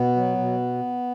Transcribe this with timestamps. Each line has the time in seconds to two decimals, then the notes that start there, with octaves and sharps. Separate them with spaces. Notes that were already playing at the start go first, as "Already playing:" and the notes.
Already playing: B2 B3
0.16 F#3
0.38 B2